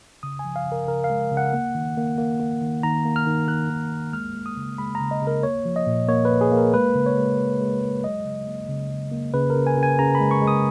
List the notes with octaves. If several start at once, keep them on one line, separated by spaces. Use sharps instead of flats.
C#3 D#6
G#5
F3
F5
C#3
A#4
C#3 A#4
F5
G#3
C#3
F#5
A#3
D#3
A#3
A#3
A#3
D#3
D#3 A#5
A#3
F6
D#3
D#3 F#6
D#3
A#3
G#3 F6
G#3
D#6
C#3
G#3 B5
A#5
C#3
D#5
C#3
A#4
A#3 C#5
F3
D#5
A#2
A#3 C#5
B4
A#3
G#4
A#3
A#4
G#3 B4
C#3
C#5
G#3
C#3
G#3
G#3
F#3 D#5
C#3
A#3
C#3
C#3
A#3
C#3 B4
A#4
C#3
G#5
C#3
G#5
C#3 A#5
B5
G#3
C#6
G#3
D#6